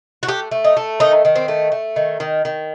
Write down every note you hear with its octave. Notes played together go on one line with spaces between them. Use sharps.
F#4
A3 G4
A3
D#4
A3
D#3 D#4
D#3
C4
A3
A3
D#3
D#3
D#3